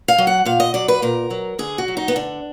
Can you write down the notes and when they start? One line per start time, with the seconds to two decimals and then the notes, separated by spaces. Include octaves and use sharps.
0.08 F5
0.18 F#3
0.27 F#5
0.45 A#2 F5
0.60 D#5
0.74 F#3 D5
0.88 B4
1.02 A#2 A#4
1.31 F#3
1.59 D3 G#4
1.78 F#4
1.88 F#3
1.97 D#4
2.08 B3
2.16 D3 D4